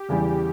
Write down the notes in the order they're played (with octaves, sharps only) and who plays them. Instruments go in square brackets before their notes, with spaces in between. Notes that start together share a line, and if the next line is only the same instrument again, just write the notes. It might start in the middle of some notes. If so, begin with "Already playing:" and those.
Already playing: [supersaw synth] G4
[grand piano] E2 C#3 E3 G3